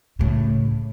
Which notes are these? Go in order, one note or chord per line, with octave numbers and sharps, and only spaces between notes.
A2 C#3